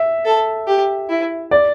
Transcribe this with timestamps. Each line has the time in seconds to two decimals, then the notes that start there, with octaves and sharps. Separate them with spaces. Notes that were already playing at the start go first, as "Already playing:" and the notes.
Already playing: E5
0.25 A4
0.67 G4
1.09 E4
1.51 D5